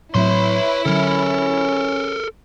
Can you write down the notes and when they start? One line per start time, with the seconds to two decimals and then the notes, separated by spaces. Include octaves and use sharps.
0.15 A2 F#3 C4 E4 B4 C#5 C6
0.85 D3 F#3 C#4 A4 A#4